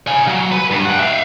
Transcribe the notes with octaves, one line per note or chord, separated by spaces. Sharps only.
F5 G#5
F#3
B4
G2
F#5 G5
E5 F5